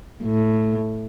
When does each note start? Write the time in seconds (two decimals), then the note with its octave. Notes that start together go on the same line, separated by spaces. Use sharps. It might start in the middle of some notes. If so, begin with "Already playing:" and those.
0.23 A2